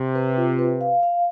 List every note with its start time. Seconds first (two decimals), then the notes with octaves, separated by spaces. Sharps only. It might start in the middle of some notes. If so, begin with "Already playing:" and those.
Already playing: C3
0.15 B4
0.37 F4
0.59 B4
0.81 F5
1.03 F5